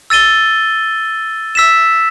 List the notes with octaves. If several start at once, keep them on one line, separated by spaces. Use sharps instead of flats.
E6 A6 D#7 G7
E6 B6 E7